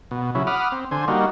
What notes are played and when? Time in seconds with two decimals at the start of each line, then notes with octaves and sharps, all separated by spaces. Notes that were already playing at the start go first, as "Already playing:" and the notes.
0.11 B2
0.35 C#3 F#3 E4
0.47 F#5 B5 D6 D#6 F6
0.72 C4
0.91 D3 C5 G#5
1.08 G3 A#3 D#4 F#4